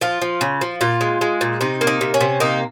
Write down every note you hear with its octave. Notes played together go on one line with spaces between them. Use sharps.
F3 F4
F3
C#3
F3
A#2 F4
G#3
G#3
A#2
C3 D#4
A#3
D#4
C3
C#4
C3
A#3 D#4